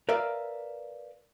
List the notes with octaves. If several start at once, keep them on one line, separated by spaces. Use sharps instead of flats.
A#4 B4 D5 E5 F5